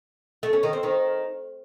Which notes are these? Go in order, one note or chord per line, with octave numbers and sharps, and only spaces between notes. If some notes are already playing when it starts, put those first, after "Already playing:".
A3
C#4
D#3
C4
D#3